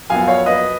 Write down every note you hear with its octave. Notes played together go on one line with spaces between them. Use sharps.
F#2 F3 B3 F5 G#5
C#5 F5
B4 D#5